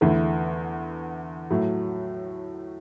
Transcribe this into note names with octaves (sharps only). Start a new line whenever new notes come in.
E2 D3 A3 E4 A4
A2 F#3 A3